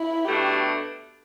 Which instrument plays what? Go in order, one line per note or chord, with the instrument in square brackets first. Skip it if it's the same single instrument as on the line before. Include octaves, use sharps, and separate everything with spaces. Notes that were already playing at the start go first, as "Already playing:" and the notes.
Already playing: [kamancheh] E4
[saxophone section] B2 A3 D4 [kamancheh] G4